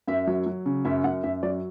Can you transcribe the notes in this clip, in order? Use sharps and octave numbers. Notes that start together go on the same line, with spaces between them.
F#2 E5
F#3
F#3
C#3
F#2 E5
F#2 F#5
F#2 E5
F#3 D5